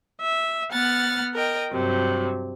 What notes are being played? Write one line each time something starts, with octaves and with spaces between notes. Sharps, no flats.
E5
B3 F#5 F6 A6
A#4 D#5 G5
G2 C3 F#3